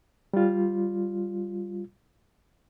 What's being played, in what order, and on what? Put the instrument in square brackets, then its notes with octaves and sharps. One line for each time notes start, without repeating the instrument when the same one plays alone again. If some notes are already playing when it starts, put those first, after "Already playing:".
[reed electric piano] G3 F4